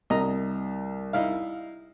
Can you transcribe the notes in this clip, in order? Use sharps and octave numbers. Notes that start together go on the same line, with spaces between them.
C2 D#5 A#5
D#4 E4 F5